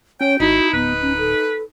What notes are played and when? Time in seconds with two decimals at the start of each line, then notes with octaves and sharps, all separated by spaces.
0.21 C#4 C#5 G5
0.40 G#1 D#4 E4 F#4
0.73 D1 B3 B4
1.02 C#4
1.18 A4